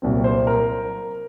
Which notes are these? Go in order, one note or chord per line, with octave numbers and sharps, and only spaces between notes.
C2 A#2 F#3 C4
C5
A#4